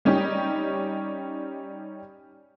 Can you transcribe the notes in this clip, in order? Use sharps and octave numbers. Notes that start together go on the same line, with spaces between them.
G3 C#4 D#4 G4